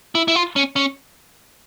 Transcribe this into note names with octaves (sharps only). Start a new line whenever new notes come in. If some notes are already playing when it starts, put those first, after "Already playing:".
E4
E4
F4
C#4
C#4